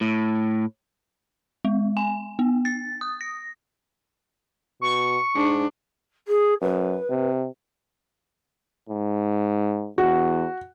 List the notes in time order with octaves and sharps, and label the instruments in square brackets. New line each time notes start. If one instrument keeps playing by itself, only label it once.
[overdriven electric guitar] A2
[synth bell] G#3
G#5
B3
A6
D#6
A#6
[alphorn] B2 [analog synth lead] C#6
[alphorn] G#2 [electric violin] D4
[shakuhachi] G#4
[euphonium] F#2 [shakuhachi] B4
[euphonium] C3
G#2
[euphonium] E2 [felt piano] F#4